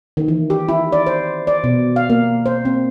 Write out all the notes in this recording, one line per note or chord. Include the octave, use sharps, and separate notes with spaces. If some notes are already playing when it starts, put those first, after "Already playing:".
D#3
E3
G4
E4
D5
C5
D5
B2
F5
A#3
C5
C4